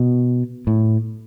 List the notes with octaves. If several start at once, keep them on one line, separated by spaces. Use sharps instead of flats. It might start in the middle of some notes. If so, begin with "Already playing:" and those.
Already playing: B2
A2